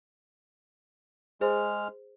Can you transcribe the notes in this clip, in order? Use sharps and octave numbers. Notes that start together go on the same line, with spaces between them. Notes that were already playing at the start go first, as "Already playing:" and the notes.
G#3 G#4 C5 F6